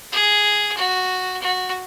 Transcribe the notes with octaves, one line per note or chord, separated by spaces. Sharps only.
G#4
F#4
F#4